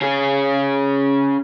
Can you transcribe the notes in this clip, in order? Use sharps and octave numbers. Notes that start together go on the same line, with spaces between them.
C#4 G#4